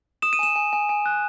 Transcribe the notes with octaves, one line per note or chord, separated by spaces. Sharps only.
D#6 E7
D#7
G#5 E7
G#5
G#5
G#5
F#6